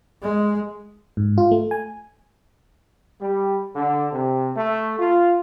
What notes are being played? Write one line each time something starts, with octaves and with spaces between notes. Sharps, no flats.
G#3
G#2
F4
A3
G#5
G3
D3
C3
A3
F4